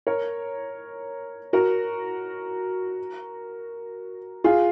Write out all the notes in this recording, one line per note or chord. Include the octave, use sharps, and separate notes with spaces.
A#4 C#5
F#4 A#4
F4 G#4